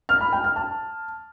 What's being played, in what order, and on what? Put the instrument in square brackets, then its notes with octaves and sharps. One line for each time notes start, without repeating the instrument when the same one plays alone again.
[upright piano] F6
B5
G5
F6
A5